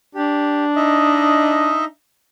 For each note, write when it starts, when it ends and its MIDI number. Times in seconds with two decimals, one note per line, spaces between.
0.15 1.91 62
0.15 0.64 67
0.76 1.85 63
0.76 1.85 75
0.76 1.85 76